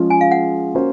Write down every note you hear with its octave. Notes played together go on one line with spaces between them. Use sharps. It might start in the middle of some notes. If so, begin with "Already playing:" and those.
Already playing: F3 G#3 C#4 F4 G#4
G#5
F5
F#5
A#3 C#4 F#4 C5